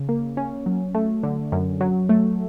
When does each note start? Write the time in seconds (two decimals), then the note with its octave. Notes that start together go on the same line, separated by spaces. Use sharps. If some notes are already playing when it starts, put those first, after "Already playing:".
Already playing: C#3
0.09 A#3
0.37 C#4
0.66 F#3
0.95 A3
1.23 D3
1.52 F#2
1.81 F#3
2.09 A3